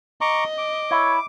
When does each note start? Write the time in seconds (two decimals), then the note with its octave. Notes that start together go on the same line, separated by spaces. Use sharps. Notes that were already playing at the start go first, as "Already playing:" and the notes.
0.21 D#5 A#5 C#6 D6
0.58 D6
0.91 E4 C#5